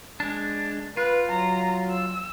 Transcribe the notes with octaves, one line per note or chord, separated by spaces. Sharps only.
G#3 D4
F4 B4
F#3 A#5
E6